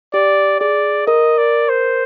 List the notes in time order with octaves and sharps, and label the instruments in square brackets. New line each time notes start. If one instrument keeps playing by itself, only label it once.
[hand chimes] G4 [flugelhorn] D5
[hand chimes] G#4 [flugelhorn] D5
[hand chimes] A#4 [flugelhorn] D#5
[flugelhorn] D5
C5